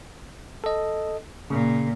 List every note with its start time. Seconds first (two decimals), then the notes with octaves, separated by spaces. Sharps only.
0.64 A4 D#5
1.50 A#2 C#3